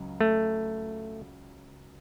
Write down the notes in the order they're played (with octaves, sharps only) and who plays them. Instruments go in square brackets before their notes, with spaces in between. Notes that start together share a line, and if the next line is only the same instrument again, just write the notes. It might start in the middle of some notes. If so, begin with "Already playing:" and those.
Already playing: [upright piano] C#2 C#3 F#3
[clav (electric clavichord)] A3